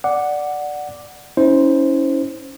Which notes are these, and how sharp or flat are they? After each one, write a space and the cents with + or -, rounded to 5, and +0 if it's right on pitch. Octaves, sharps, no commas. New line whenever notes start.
D5 +0 F#5 +0 D6 +0
C#4 +0 E4 -40 C5 +0